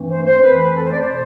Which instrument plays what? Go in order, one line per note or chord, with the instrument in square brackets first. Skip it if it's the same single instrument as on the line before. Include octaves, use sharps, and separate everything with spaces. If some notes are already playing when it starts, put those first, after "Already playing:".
Already playing: [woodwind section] G2 E3 A3 C4
C5
C5
F2 E3 A3 C4 B4
B4
A4
C5
D5
C5
B2